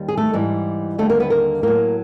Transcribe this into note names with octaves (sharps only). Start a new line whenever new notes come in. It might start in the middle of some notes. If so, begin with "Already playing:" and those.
Already playing: D#2 D#3 G3
G#4
A3 A4
G#2 E3 G3
D#2 D3 G3 A3 A4
A#3 A#4
B3 B4
A#3 A#4
A2 F#3 A#3 A#4